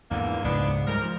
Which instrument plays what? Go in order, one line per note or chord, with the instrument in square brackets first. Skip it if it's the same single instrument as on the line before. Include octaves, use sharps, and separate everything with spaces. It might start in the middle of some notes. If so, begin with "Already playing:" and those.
[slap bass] E2 G#2 E3 [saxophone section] D3 A#3
[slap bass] C#2 G#2 C#3 [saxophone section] B3 D4
[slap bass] G#2 G3 [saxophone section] A#4
[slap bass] F3